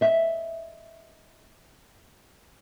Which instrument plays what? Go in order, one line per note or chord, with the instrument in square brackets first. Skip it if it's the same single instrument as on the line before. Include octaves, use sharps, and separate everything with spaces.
[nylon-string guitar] D#5 E5